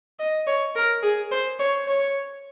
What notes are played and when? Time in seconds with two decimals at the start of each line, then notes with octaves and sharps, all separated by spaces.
0.19 D#5
0.47 C#5
0.75 A#4
1.03 G#4
1.31 C5
1.59 C#5
1.88 C#5